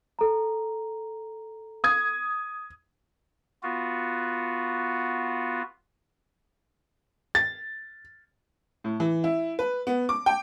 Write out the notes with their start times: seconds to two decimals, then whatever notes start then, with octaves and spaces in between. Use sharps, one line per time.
0.19 A4 A#5
1.84 D#6 G#6
3.63 B3 F4 F#4
7.35 A6
8.84 A2
9.00 E3
9.24 E4
9.59 B4
9.87 B3
10.09 D6
10.26 G5